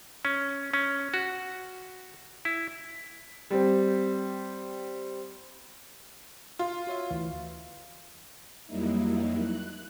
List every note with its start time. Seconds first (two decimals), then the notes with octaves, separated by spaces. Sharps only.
0.25 C#4
0.74 C#4
1.14 F#4
2.45 E4
3.50 G3 C4
6.59 F4
6.87 F#4 C#5 E5
7.10 D2 E3 F5
8.66 F2 F#3 G3 A#3 D#4 E4
9.38 F#6